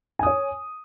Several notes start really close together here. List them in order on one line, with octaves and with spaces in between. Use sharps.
G#5 D#6 C#5